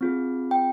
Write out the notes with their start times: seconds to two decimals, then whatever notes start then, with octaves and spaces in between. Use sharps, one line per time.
0.01 C4 F4 G#4
0.51 G5